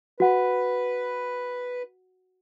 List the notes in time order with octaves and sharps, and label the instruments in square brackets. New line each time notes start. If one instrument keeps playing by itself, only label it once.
[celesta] F#4 F#5 [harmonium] B4